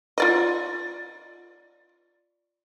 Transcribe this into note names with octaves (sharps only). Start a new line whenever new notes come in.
F4 D5 D#5